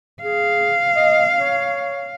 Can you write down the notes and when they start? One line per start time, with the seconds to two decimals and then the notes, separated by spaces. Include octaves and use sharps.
0.22 G#4 F5
0.96 D#5
1.37 C#5